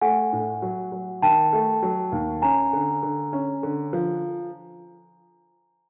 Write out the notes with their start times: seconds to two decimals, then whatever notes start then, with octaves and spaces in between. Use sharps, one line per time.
0.01 A3 F#5 G#5
0.33 A2
0.62 F#3
0.92 F#3
1.22 D#3 G5 A5
1.53 A3
1.82 F#3
2.12 D#2
2.42 C#4 G#5 A#5
2.73 D3
3.03 D3
3.33 C#4
3.63 D3
3.93 F3